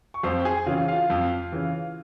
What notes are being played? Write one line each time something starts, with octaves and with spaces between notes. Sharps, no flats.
C#6
F2 C5 C6
G5
G#4 G#5
C#3 E3 F4 F5
F4 F5
F2
C#3 E3